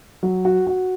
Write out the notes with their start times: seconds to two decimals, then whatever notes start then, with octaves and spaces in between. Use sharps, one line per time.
0.23 F#3
0.45 F#4
0.67 F#4